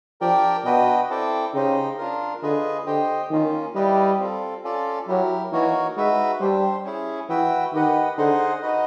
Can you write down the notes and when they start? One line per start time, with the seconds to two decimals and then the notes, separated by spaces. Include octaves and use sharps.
0.21 F3 D4 G4 A#4 D5 G5
0.65 B2 D4 F#4 B4 D#5 G5
1.09 C4 E4 A4 D5 G5
1.54 C#3 D#4 G4 C5 D#5
1.98 D4 F4 A#4
2.42 D3 F4 G#4 B4 D#5
2.86 D3 G4 C5 D#5 G5
3.30 D#3 A#3 C#4 F4
3.75 G3 E4 G4 B4 D#5
4.19 C4 F4 A4
4.63 C#4 F4 A4 D5
5.08 F#3 E4 G4 A#4
5.52 E3 A#3 D#4 F#4 A#4 C#5
5.96 G#3 D#4 F#4 B4 E5
6.40 G3 D4 G4 C5
6.85 C#4 E4 G#4
7.29 E3 F#4 B4 E5 G5
7.73 D#3 G4 B4 D#5 F#5
8.17 D3 D#4 G#4 C5 D#5 F#5
8.62 D#4 F#4 B4 D#5